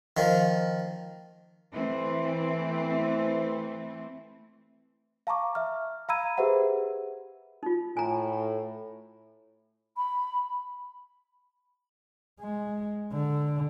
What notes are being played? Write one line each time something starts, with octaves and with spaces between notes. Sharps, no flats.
D#3 F3
E3 A3 C4
F5 A5 A#5 C#6 D6
E5 F6
F5 A#5 B5 E6 G#6 D#7
G4 G#4 B4 C5 E5 F#5
D#4 F4
A2 G#5 A#5
B5
G#3
D3